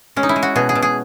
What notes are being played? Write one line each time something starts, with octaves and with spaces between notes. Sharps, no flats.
G#3 C#4
D#4
E4
G#3
F#4
B2 G#4
G#4
B2
G#4